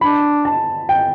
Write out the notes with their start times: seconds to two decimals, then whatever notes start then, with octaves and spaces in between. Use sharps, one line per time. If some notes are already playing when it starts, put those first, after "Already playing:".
0.01 D4 B5
0.45 A5
0.89 G5